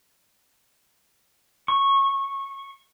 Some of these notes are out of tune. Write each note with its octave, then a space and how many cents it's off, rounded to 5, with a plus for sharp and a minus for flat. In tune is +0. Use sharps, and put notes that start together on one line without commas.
C#6 -15